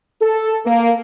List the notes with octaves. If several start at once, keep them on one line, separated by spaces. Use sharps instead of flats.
A4
A#3